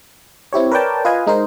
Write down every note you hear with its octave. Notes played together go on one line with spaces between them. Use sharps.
C4 E4 G4 C#5
A#4 B4 C#5 D5 G5 A5
F4 B4 D#5 F5 G#5
G#3 D#4 A#4 C5